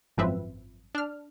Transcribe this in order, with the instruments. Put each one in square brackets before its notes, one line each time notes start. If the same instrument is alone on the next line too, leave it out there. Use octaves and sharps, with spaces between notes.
[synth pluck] G#1 F#2 F3 C4 B4 E5
D4 F6